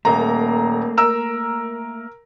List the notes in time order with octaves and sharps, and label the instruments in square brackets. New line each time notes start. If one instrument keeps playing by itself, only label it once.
[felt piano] D#1 A#5 [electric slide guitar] A3 A#3
[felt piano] A#4 A#5 E6